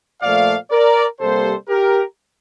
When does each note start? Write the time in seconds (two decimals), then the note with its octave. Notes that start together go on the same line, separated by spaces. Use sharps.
0.22 A#2 F3 A3 D5 F5
0.71 A#4 D5
1.20 C3 G3 A#3 A4 C5
1.69 G4 A#4